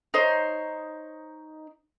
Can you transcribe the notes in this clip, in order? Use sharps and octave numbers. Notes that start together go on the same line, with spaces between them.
D#4 C5 C#5